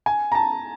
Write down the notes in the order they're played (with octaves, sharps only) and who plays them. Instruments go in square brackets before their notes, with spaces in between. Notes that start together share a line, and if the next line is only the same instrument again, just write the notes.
[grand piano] G#5
A#5
A5